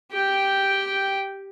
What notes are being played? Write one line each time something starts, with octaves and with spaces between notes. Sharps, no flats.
G4 G5